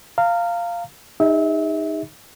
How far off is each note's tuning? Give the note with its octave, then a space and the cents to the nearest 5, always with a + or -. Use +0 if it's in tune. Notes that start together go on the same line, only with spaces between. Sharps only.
F5 -10 A#5 -30
D#4 +0 G#4 -45 E5 -30